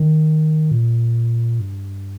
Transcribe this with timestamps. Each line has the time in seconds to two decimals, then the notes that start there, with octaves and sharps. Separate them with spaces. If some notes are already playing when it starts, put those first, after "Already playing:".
Already playing: D#3
0.71 A#2
1.60 G2